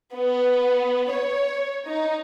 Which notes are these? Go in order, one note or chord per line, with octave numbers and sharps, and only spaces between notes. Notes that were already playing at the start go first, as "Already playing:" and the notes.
B3
C#5
D#4